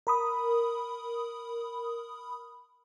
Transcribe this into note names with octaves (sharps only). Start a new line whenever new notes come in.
A#4 B5 D#6